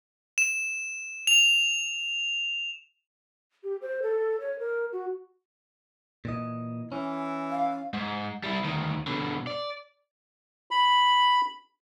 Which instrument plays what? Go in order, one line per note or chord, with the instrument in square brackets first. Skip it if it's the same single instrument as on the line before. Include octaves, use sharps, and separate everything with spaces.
[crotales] E7
F7
[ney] G4
C5
A4
C#5
A#4
F#4
[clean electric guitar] A#2 E3 D#5
[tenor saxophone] E3 [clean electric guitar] C#4
[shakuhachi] F5
[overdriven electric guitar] G#2
G3 E4
D2 D#3
B2 D3
D5
[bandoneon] B5